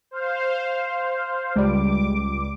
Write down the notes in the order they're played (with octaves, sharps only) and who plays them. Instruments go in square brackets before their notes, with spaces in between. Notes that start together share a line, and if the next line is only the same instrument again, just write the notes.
[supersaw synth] C5 F5
[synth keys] C#2 G3 [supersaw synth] D6